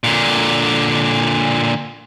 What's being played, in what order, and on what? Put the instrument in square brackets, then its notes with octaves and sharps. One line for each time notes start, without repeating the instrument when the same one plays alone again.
[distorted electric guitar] A#2 D3